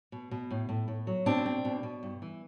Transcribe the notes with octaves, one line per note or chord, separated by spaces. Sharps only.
B2
B2
A2
A2
A2
F#3
B2 C4 D4
C4
B2
B2
G2
E3